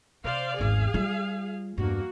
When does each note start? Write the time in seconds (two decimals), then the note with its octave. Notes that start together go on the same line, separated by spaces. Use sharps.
0.24 C3 C5 D5 F5
0.59 G#1 E2 G#4 F5
0.94 G3 F4
1.78 E2 G2 A#3 F#4